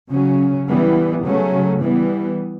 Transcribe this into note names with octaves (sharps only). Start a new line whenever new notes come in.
C#3 F#3 C#4
E3 G3 B3
C#3 F#3 A3 C#4
E3 G3 B3